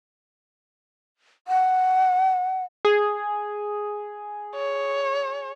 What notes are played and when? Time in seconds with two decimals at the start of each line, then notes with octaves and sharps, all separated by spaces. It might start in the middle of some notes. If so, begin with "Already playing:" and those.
1.48 F#5
2.85 G#4
4.56 C#5